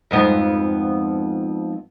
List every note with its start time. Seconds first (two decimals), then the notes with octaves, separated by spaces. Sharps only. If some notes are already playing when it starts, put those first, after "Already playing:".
0.11 F2 G#2 B3